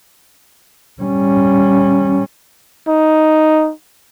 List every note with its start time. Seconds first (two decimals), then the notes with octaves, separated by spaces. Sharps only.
1.02 G3 C#4
2.88 D#4